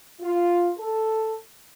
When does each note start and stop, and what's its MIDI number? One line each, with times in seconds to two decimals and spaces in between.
0.21 0.69 65
0.78 1.36 69